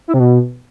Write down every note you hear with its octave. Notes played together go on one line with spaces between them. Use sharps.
E4
C3
B2